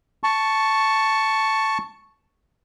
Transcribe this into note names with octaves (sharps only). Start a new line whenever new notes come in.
A5 C#6